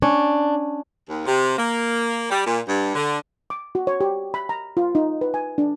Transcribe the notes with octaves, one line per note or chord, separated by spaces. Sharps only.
C#4 D4
D#2
C3
A#3
G3
A#2
G2
D3
D6
F#4
C#5
G4
B5
A#5
F4
D#4
B4
G#5
D4